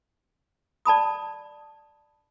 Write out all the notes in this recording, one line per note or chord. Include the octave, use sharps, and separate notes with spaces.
D5 A5 B5 D#6